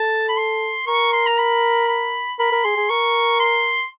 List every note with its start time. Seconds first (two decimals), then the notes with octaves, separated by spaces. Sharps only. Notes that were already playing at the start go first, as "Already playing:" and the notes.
Already playing: A4 A5
0.29 B5
0.37 C6
0.87 A#4 C#6
1.13 C6
1.27 A#5
1.38 B5
1.88 B5
2.39 A#4 B5
2.52 A#4
2.64 G#4 C6
2.77 G#4
2.89 A#4 C#6
3.40 C6